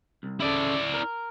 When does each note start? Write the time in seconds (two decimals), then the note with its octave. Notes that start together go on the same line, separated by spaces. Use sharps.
0.23 C2
0.40 C#3 E4 A4 D5
0.94 A#4